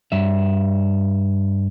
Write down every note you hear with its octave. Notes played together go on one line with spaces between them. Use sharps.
G2 E5